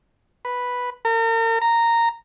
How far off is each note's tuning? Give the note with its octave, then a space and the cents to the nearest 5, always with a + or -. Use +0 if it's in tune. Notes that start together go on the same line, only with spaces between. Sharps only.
B4 -5
A#4 -40
A#5 -10